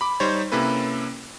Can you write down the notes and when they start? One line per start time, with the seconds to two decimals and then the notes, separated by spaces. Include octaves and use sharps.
0.01 B5 D6
0.20 G3 D#4 C5 C#5
0.52 C3 A#3 C#4 E4 A4 B4